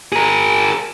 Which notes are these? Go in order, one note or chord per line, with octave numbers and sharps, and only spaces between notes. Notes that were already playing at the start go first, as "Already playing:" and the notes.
G#4 A#4